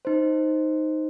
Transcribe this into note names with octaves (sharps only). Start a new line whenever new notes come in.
D#4 C5